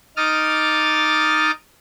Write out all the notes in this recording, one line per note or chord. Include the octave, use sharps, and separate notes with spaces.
D#4 D6 D#6 F6 A6